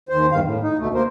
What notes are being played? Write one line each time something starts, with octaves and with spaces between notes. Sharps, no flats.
D#2 C5
E2 G2 D#3 F5
A2
D#4
D2 B2 A3
A#3 A#4 C5